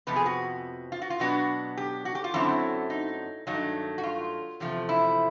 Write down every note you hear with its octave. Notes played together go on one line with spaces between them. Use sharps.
F2 C3 F3 B3 B4
G#4
F#4
F4
F#4
F4
B2 F#3 B3 D4 F#4
G4
F#4
G4
F4
F#2 D3 F#3 A3 C4 E4
D#4
G2 D#3 F#3 A3 D#4
F#4
F4
E2 C3 F3 A3
E4